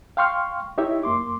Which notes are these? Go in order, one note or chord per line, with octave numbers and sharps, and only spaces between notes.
F5 G5 C6 C#6 F6
D#4 E4 G4 C#5 E5
F#2 A#3 C6 D6